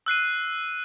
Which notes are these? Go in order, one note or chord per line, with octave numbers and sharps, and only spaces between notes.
E6 F#6 C7 D#7